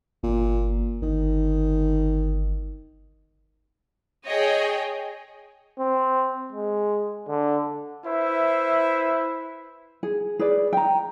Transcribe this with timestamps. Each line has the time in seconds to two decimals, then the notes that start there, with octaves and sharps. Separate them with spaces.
0.23 G1 A#2
1.02 G1 D#3
4.27 G#4 C#5 D#5 G5
5.79 C4
6.52 G#3
7.28 D3
8.05 E4 B4 C5 E5
10.03 G#4
10.39 G#4 B4 D5
10.73 G5 A#5